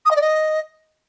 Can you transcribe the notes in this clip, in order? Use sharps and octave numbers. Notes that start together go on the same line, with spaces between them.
D#6
D#5
D5
D#5